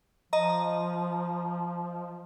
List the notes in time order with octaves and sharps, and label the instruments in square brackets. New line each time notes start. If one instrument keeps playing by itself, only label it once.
[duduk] F3 [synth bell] D#5 A#5